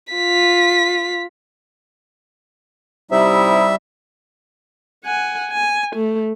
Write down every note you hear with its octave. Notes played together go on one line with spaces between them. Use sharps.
F4 B6
C3 G3 D#4 E4 E5
F#5 G#5
G#5
A3